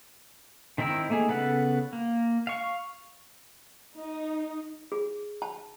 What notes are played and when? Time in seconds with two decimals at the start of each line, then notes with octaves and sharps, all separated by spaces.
0.78 D#3 C4 E4 A#4 E6
1.10 A3 A#3 D#4 G#4
1.29 C#3 B3 A4 B4 F#5
1.93 A#3
2.47 F5 C#6
3.98 D#4
4.92 G#4
5.42 A5